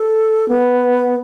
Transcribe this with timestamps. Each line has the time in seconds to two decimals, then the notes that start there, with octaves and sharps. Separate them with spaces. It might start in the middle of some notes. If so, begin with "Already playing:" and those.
Already playing: A4
0.48 B3